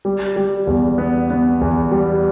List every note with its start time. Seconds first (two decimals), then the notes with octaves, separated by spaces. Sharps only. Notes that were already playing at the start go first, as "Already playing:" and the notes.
0.05 G3
0.36 G3
0.67 E2
0.98 B3
1.30 B3
1.61 E2
1.92 G3